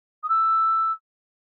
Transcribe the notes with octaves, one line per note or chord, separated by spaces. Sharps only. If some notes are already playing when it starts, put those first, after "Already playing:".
D#6
E6